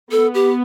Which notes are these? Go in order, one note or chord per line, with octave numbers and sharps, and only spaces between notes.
B3 A4
G4